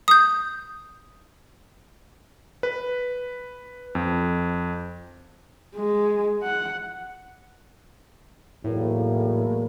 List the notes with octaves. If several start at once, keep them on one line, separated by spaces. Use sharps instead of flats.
D#6 G6
B4
F2
G#3
F#5
B1 E2 A2 A#3